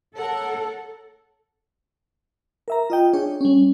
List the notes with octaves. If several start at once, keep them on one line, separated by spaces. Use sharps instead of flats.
A4 A#4 C#5 F#5
A#4 E5 A#5
F4 D#5 G5
D4 G#4 C#5
G3 C#4